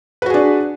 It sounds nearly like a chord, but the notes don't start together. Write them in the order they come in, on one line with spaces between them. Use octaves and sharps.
B4 F#4 G#4 D4